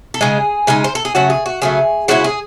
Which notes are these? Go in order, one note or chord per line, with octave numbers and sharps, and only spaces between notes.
A4
C#3 G#3 D#4 G#4
C#3 G#3 D#4
C5
A4
G#4
C#3 F#3 A3 F#4
G#4
F#4
C#3 F#3 A3 G#4
C#3 G#3 C#4 E4 F#4
G#4